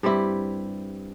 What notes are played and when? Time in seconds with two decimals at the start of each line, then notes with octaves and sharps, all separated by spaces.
0.03 G2 G3 C4 E4